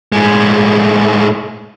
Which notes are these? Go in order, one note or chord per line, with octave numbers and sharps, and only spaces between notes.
A2 G#3